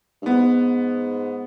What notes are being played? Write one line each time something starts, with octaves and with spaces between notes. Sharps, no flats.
G2
G#2 B3